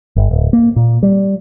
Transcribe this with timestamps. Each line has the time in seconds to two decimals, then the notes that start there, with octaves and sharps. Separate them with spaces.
0.16 G1
0.31 D1
0.53 A#3
0.76 A#2
1.03 G3